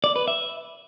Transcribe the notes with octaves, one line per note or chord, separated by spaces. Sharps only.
D5
B4
E5